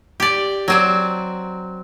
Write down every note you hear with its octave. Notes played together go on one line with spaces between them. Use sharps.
G4 D5
F#3 C4 D5